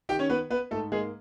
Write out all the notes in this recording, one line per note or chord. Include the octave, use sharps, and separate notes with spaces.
D#3 G4 G5
C#4 C#5
B3 B4
B3 B4
G#2 A3 A4
G#3 A#3 G#4